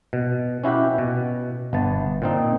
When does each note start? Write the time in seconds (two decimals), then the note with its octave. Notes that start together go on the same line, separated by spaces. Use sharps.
0.13 B2
0.64 C#4 E4 F#4 G4 B4
0.98 B2
1.73 G1 B3 A5
2.22 A#2 C4 D#4